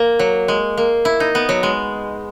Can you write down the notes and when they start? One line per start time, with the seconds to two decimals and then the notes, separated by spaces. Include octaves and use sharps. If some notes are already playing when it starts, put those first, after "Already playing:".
Already playing: A#3
0.19 F#3
0.48 G#3
0.77 A#3
1.05 E4
1.20 D#4
1.35 B3
1.49 F#3
1.63 G#3